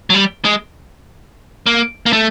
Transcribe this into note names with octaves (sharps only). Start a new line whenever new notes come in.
F#3
G3
G#3
A#3
A#3
A3